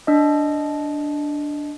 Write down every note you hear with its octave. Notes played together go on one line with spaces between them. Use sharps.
D4 D#5